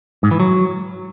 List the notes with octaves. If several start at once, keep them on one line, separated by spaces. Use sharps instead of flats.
G#2
E3
F#3